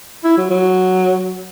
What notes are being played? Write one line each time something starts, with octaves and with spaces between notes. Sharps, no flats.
E4
F#3
F#3